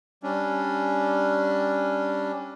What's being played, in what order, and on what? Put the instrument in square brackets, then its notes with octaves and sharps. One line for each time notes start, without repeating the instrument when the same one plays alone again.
[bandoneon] G3 C#4 D4